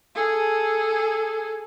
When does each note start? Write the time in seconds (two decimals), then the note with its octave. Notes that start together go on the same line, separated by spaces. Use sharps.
0.15 G#4 A4